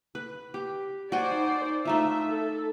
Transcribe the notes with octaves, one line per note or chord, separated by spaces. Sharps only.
B4
G4
D#4 F#4 C5 D5 G5 G#5
A3 D#4 F4 E5
A4